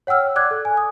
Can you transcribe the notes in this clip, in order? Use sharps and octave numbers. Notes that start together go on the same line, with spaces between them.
C#5 F#5 G5 E6 F6
D5 D6 F#6 G#6
A4
G#5
D#6